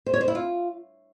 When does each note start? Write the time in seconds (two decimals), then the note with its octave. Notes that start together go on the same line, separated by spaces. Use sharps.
0.06 C5
0.14 C#5
0.21 C5
0.28 E4
0.35 F4